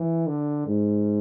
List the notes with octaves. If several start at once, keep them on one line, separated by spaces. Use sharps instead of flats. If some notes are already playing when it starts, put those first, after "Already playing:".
Already playing: E3
D3
G#2